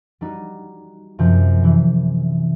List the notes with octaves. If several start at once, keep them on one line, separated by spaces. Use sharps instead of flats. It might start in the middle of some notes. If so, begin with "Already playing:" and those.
G3 D#4 F#4
F#2 C3 F3 G6
C3 E3 E4